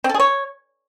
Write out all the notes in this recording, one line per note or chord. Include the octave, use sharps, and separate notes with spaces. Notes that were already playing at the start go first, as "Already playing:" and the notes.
C4
A4
G#4
C#5